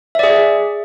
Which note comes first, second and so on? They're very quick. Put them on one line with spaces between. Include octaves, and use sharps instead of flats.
E5 D5 G#4